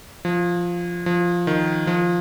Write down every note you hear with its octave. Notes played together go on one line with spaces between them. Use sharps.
F3
F3
D#3
F3